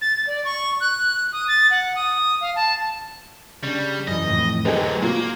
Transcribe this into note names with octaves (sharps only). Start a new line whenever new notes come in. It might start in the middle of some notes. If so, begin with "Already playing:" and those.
A6
D5
C#6
F#6
D#6
A6
F#5
D#6
F5
A5
C#3 G3 D4
F#2 E3 D#5
F2 A2 E3
D3 F#3 A3 G4 G#4 B4 C5 D#5
A#2 A#3 F#4